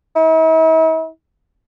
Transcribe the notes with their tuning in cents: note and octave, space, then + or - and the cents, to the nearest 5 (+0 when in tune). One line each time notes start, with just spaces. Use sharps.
E4 -45